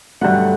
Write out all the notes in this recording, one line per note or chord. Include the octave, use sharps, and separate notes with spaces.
G2 D3 F#3 A3 F#5